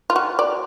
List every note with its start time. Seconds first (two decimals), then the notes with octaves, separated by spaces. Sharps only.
0.10 F4
0.16 F#4
0.39 D5